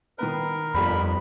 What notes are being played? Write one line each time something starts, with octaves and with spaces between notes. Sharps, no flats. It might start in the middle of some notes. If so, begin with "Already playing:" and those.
D#3 B3 A#4 B4
G1 F2 G3 B5